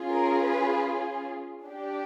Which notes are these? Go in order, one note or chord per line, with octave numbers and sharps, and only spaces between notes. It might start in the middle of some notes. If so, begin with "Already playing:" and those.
Already playing: C#4 F4 G#4
A#4
B4
D4 G4